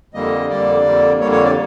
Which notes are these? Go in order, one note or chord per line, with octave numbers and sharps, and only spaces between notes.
F2 D3 G3 A#3 D#5
F2 D3 G3 A#3 D5
F2 D3 G3 A#3
F2 D3 G3 A#3 C#5
C#5
D5